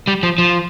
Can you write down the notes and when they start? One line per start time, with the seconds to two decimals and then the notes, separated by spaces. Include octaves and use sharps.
0.08 G3
0.23 F3
0.38 F3